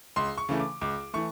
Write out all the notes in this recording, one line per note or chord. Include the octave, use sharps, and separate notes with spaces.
C#2 C6
C#6
C#3 E3 A3
D6
C#2 D6
E3 A3 C#6